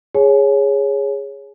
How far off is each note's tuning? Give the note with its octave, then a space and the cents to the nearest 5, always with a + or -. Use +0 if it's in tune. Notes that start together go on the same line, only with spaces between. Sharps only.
G#4 -10 C#5 +0 G#5 +35